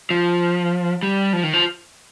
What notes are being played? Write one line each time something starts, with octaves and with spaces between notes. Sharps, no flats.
F3
G3
F3
D#3
F3